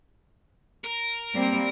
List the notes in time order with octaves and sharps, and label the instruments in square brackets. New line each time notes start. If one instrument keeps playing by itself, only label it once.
[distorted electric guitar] A#4
[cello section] G3 A#3 C4